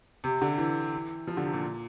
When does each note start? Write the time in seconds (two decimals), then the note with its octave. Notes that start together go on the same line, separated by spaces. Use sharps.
0.24 C3
0.42 D3
0.58 E3
1.27 F3
1.37 D3
1.45 C3
1.53 A#2